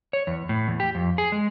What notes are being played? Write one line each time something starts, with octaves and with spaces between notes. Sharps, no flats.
C#5
E2
A2
E2
G4
F2
G#4
G#3